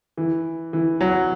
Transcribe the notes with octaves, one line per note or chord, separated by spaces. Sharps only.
E3
E3
F#3